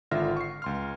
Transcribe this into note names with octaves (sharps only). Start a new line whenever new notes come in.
G#1 D3 F4 E5 F6 A#6
C#6 C7
C#2 C6 F6